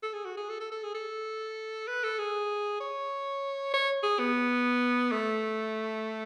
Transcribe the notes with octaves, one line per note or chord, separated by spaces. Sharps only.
A4
G#4
F#4
G#4
A4
A4
A4
G#4
A4
B4
A4
G#4
C#5
C#5
G#4
B3
A3